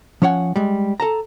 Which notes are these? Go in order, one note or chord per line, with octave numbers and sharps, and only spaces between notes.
F3 C#4 C#5 F#5 G#5
G3 G#3
A4 A5 A#5